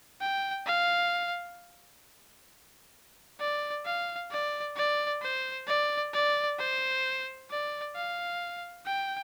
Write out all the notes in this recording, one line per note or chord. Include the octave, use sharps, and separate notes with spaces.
G5
F5
D5
F5
D5
D5
C5
D5
D5
C5
D5
F5
G5